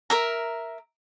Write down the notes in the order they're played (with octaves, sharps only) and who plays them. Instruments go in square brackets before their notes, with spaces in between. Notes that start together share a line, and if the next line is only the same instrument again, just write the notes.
[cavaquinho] A#4 E5 A#5